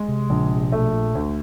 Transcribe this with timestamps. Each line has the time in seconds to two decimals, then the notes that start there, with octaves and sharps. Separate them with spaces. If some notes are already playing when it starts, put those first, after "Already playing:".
Already playing: G#3
0.09 C3
0.30 A#1 C#3
0.51 C3
0.72 B2 A3
0.94 A#2
1.15 D2